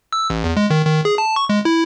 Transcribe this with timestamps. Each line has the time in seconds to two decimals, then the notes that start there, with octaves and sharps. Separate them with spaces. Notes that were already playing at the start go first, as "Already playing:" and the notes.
0.13 E6
0.30 A1
0.44 E2
0.57 G#3
0.70 D#3
0.86 D#3
1.05 G#4
1.18 A5
1.36 C#6
1.49 G#3
1.65 E4